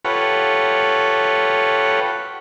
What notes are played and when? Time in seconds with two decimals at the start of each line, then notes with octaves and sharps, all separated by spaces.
0.05 F4 G4 A4 B4 C#5 F#5